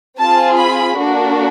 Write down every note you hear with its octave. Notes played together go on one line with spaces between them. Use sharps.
C4 F4 G#4 A5
B5
A#3 D4 F#4 A4